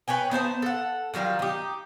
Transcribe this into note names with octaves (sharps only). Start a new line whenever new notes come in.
B4 C#5 G5 G#5
B3 D#4 C5 A5
A4 F#5
D#3 F#3 G3 F4
D#4 G4